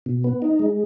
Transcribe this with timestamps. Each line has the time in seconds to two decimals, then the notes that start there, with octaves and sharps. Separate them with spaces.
0.06 B2
0.24 B3
0.42 D#4
0.59 G#3